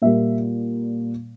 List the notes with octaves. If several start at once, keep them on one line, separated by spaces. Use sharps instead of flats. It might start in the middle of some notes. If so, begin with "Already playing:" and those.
A#2 G3 A#3 E5